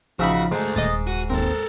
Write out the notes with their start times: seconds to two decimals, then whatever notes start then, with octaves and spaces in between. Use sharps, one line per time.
0.19 A1 C#3 F3 D#4 F#4 E5 B5
0.51 D2 G#2 G#3 A3
0.76 D#1 D#5 D#6 A6
1.07 F#4 D#7
1.30 G#1 D#2 C4 A4 A#4